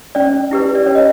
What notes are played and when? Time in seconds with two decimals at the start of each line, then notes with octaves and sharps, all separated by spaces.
0.15 C#4 D5
0.51 E4 G4 B4
0.75 D5
0.86 C#4 C#5
0.95 D#5